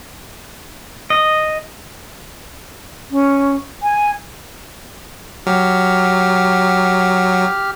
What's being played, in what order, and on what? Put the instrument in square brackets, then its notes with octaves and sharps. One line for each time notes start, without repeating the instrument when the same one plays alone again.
[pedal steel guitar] D#5
[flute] C#4
G#5
[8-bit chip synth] F#3 [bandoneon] G4 F6